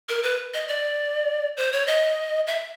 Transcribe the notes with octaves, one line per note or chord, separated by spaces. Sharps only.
A#4
B4
D#5
D5
C5
C#5
D#5
E5